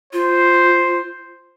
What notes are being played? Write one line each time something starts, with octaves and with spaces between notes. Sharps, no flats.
F4 C5